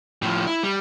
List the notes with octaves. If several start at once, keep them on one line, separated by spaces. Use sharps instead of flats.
A2 F3
E4
G3